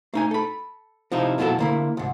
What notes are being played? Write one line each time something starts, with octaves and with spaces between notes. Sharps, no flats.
A3 D#4 G#5
A4 B5
C3 F3 D#4 E4
F2 B2 F#3 E4 A4 A5
D3 A#3 E4
C2 G#2